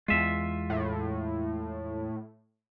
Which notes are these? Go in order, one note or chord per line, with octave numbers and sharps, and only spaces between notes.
E2 G#3 F4 E5
A2